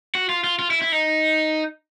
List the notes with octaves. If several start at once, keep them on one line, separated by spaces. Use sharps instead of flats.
F#4
F4
F4
F4
E4
E4
D#4